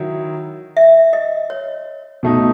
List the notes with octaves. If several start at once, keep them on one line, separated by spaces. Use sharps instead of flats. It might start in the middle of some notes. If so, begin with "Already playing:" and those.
Already playing: D#3 F#3 E4
E5
D#5
C#5
B2 A3 D#4